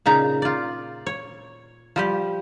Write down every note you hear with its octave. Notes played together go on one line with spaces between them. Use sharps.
A#2 C#3 D#4 A#5
F4 D5
C#5
F3 G3 G4